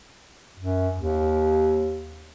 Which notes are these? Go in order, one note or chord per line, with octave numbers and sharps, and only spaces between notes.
F#2
D#2